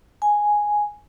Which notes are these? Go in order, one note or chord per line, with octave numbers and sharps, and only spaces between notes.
G#5